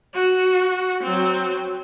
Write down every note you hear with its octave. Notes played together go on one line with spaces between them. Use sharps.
F#4
F#3 C4